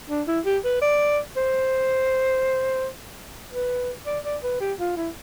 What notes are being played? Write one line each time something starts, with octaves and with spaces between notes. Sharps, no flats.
D4
E4
G4
B4
D5
C5
B4
D5
D5
B4
G4
F4
E4